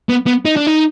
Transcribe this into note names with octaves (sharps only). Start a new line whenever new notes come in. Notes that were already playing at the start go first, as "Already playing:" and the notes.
B3
B3
D#4
D4
D#4